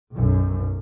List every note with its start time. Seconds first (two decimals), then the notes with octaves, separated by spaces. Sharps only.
0.13 B1 F#2